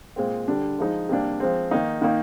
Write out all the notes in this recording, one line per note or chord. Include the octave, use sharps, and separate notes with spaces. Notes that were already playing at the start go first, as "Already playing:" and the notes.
A#2 G#3 C4
D3 G3 D4
F3 G#3 D#4
C3 G3 A#3 D4
F3 G#3 C4
D#3 A#3 D#4
D#3 A#3 D#4